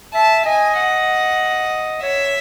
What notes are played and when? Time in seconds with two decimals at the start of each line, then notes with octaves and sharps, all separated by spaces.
0.14 E5 A5
0.45 D#5 G#5
0.77 F#5
2.02 C#5 E5